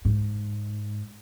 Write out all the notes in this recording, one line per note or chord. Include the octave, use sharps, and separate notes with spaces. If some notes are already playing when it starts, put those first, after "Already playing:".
G#2